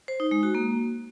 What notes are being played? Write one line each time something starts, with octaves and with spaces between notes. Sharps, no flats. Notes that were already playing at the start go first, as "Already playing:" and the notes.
C5
D#4
G#3
F#4
A#3